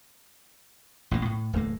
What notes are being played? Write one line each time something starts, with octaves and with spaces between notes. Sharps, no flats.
A1 A#2 D#3 A#3
A2
D1 E2 A3 A#3